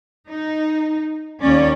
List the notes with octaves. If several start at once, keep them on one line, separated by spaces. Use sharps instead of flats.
D#4
D#2 C#4 D5